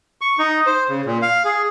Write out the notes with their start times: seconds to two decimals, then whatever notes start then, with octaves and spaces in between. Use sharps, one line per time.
0.21 C#6
0.39 D#4
0.67 C5
0.89 C#3
1.06 A#2
1.22 F5
1.45 G#4